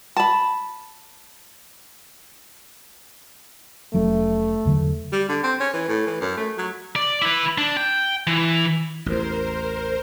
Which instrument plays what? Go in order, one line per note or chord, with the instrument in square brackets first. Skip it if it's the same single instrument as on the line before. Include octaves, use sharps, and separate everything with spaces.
[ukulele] A5 B5
[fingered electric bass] F1 F#3 C#4 [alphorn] A3
[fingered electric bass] E2 D3 F#3
[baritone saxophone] G3
D3
C4
C#4
E3
A2
E3
F#2
A3
F#3
[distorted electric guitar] D5
E4 B4
D4
G5
E3
[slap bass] A1 E2 [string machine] A#4 C5